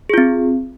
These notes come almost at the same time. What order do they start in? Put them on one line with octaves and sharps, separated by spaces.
G#4 F4 C4